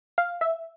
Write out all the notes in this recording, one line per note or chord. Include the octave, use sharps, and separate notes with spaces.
F5
E5